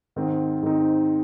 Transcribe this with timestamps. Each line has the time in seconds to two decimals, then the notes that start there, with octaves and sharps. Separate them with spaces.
0.16 G#2 D#3 C4 D#4
0.63 G#2 D#3 C4 D#4